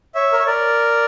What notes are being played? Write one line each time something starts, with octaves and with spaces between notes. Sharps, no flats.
C#5 E5
A#4
C#5
A#4 D5